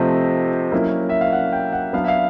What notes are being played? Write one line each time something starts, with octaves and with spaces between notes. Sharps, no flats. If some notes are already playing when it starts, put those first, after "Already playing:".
Already playing: C3 F3 A3 C4 D#5
F#3 A#3 C#4 E4
E5
F5
F#5
G5
F#5
F#3 B3 D4 F5
E5
F5